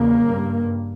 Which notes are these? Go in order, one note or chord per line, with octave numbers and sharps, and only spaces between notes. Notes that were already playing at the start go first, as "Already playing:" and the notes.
Already playing: E2 C#3 A#3
G2